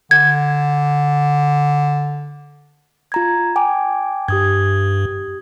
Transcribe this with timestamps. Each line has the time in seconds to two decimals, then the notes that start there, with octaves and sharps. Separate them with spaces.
0.11 D3 G#6
3.12 F4 A#5 G#6
3.56 G5 G#5 D6
4.28 G2 G4 D#6 G#6